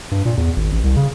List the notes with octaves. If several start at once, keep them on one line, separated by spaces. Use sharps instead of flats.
G2
A#2
E2
G#1
A1
C2
C#3